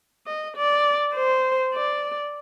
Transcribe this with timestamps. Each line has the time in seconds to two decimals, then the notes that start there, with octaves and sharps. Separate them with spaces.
0.27 D#5
0.56 D5
1.15 C5
1.74 D5